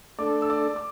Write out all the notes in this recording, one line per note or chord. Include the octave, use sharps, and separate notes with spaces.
A3 D4 A4 D5 D6
E6
D5 D6
D6